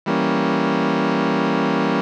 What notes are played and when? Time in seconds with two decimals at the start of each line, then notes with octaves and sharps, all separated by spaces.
0.06 E3 G3 A#3 C#4